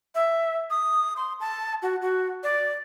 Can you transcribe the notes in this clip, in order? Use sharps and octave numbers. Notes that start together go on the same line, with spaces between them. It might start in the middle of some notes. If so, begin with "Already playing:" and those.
E5
D#6
C6
A5
F#4
F#4
D5